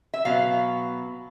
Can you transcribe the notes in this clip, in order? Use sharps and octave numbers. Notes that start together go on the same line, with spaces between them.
E5
B2 F#3 B3 F5